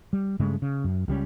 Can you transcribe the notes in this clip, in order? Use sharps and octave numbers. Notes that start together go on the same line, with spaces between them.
G3
G2 C#3 G#3 A3
C#3
F#2
C#2 G3 G#3 C#4